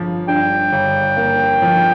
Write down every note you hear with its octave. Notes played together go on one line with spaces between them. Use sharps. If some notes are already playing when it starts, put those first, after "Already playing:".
Already playing: G1 F3
G2 G5
G1
A#3
F3